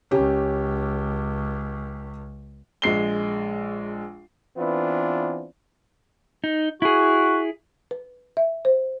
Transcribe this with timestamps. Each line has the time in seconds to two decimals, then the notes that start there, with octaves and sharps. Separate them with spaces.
0.11 C#2 C#4 G4
2.82 A#1 G#3 C7 G7
4.57 E3 B3 C4 D4 E4 F4
6.44 D#4
6.82 E4 F#4 G#4
7.91 B4
8.37 E5
8.65 C5